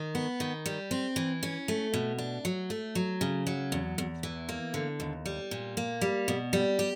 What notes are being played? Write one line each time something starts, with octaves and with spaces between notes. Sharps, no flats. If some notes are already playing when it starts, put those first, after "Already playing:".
Already playing: D#3
B3
D#3
G3
C4
E3
C#4
A3
B2
D4
F#3
A3
F#3
C#3
F#3
E2
E2
E3
A#3
D3
D#2
G3
A#2
A#3
G3
B2
G3
G4